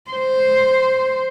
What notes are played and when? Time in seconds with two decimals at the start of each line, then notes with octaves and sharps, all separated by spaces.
0.11 C5